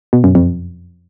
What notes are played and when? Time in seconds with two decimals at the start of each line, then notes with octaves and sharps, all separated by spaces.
0.13 B2
0.24 F#2
0.35 F2